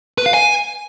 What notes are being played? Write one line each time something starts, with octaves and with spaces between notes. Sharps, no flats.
B4
F5
G#5